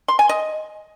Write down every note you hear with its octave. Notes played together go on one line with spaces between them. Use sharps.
C6
G#5
D#5